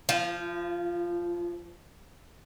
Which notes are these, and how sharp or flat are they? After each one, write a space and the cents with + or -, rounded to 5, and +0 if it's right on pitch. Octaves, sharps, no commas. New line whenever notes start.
F3 -10 F4 -45